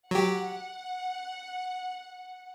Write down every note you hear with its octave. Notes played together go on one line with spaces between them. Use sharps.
F#3 G4 F#5